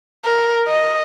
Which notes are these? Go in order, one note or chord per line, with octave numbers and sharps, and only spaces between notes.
A#4
D#5